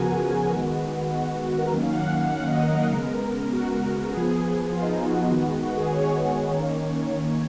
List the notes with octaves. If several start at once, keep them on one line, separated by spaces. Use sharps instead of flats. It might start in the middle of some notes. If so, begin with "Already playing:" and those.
Already playing: C#3 F3 B3 F#4 G#4 A#4 G#5
D#3 G#3 B3 F#4
F#4
F#4
A#4
D#3 F#3 A#3 C#4
F5
F#5
F#5
D#5
A#4
C#3 G#3 B3
F#4
F3 B3 G#4
G#4
F4
D#4
F4
F#4
D#3 G#3 B3
F#4
G#4
C#5
C#5
D#3 A#3 C#4